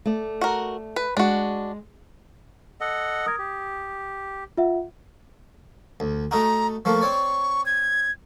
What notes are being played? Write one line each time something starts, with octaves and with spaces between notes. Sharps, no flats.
A3 D5
F#4 A#4
B4
G#3 D4 F#4
A4 D#5 F#5
A#4 D#6 G#6
G4
F4 E5 F#5
D2
A3 D#4 F#4 A#5
F3 A3 A#3 C#6
C4 C#5 D5
G#6